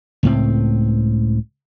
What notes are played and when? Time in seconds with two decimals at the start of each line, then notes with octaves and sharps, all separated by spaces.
0.23 C#2 A2 C4